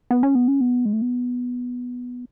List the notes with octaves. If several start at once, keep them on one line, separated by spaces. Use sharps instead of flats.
B3
C#4
B3
C#4
B3
G#3
A3
B3